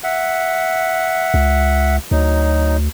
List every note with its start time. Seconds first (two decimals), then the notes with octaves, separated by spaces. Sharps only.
0.04 E5 F#5
1.34 C#2
2.11 D2 F#3 D#4